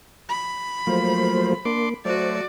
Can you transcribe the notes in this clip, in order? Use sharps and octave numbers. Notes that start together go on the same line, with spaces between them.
B5
F3 F#3 A3 A#3 C5
A#3 D4 C6 D6
F#3 A3 F#4 C5 D5